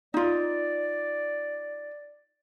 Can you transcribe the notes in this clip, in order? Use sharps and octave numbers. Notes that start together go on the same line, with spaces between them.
D#4 F4 D5